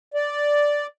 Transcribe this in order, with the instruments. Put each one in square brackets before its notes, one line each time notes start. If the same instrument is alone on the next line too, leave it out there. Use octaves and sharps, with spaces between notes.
[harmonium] D5